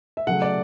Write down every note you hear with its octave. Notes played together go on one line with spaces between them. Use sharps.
E5
C#3 F#3 A3 F#5
D5